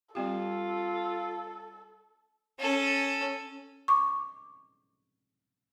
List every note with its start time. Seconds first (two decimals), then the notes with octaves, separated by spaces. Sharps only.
0.15 G3 C4 F4 G4 A4
2.59 C#4 A4
3.88 C#6 D6